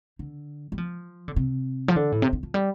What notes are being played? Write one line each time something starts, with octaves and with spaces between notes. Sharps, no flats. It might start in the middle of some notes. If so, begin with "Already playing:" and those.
D3
G3
F3
D3
C3
F3
D3
A2
C3
D3
F3
G3